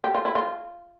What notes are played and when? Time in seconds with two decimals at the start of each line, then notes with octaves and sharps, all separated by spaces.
0.04 G4
0.14 F4
0.25 E4
0.35 F4